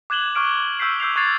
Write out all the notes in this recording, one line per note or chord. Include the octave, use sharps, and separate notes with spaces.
D6 F#6 G#6 E7 F#7 G7
C#6 D6 F6 D7 E7
C#6 E6 G6 B6 C7
E6 G6 C7 F7
C#6 F#6 G#6 A6 C7 F7